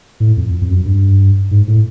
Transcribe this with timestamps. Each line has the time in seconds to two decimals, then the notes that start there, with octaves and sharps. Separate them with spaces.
0.20 A2
0.37 F2
0.61 F2
0.69 F#2
0.85 G2
1.51 G#2
1.68 A2